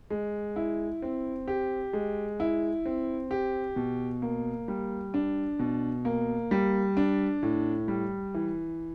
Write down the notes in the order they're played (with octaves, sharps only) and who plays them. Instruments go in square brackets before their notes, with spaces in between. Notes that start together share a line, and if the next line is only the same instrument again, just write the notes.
[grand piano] G#3
E4
C4
G4
G#3
E4
C4
G4
B2
A#3
G3
D4
B2
A#3
G3
D4
A2
G3
E3